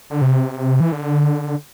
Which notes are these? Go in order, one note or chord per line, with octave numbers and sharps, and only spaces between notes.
D3
C3
E3
D3